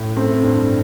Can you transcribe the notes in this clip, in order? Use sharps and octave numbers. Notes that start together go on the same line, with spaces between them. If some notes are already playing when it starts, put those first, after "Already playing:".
Already playing: A2
A3 C4
G2